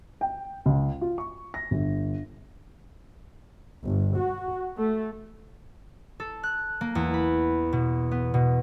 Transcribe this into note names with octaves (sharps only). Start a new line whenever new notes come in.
G5
C#2
F4
C#6
A#6
G1
G1
F#4
A3
A4
F#6
A#3
E2
B5
B2
B3
B2